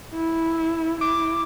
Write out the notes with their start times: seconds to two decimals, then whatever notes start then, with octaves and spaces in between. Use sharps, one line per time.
0.14 E4
1.01 E4 D6